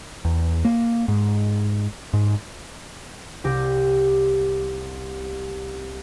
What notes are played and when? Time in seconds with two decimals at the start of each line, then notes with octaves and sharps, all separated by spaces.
0.25 E2
0.65 A#3
1.08 G#2
2.14 G#2
3.44 C2 G4 A#6